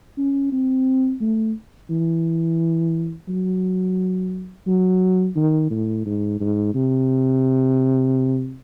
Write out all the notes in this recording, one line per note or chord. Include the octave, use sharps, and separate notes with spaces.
C#4
C4
A3
E3
F#3
F#3
D#3
A2
G#2
G#2
C3